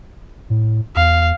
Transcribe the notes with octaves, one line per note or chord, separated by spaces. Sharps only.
A2
E2 F5